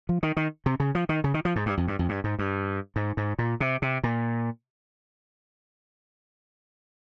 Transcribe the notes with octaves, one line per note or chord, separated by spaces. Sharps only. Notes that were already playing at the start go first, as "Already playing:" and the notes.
F3
D#3
D#3
C3
C#3
F3
D#3
C#3
D#3
F3
G#2
G2
F2
G2
F2
G2
G#2
G2
G#2
G#2
A#2
C3
C3
A#2